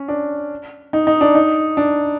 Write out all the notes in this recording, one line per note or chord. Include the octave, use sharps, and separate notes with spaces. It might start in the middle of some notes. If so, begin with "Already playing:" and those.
Already playing: C#4
D4
D#4
D#4
D4
D#4
D4